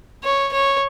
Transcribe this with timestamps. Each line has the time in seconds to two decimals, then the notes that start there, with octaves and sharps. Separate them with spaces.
0.24 C#5
0.53 C#5